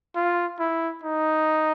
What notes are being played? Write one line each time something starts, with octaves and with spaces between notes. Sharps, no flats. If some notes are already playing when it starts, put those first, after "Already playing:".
F4
E4
D#4